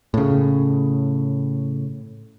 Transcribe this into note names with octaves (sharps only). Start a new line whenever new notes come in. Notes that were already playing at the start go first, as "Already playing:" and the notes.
A2 C#3